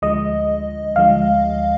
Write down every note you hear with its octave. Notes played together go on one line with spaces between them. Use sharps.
D2 D3 F3 G#3 D#5
D2 D3 F3 G#3 F5